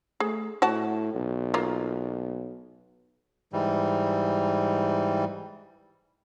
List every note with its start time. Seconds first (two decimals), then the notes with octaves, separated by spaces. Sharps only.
0.20 A3 G#4
0.62 A2 F#4 F#5 A5
1.14 B1
1.54 A#3 F4
3.53 G#2 E3 G3